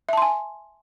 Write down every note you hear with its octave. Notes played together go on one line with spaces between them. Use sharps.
E5 G#5 A5 C6